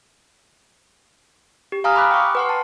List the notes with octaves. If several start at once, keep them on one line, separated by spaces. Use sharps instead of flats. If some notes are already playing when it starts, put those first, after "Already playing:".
G4
F5 G#5 A#5 D#6 F6
B5 D6 F#6
G5 C#6
B4 F#5 C6
A5